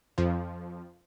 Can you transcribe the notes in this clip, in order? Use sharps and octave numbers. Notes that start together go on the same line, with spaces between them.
F2 F3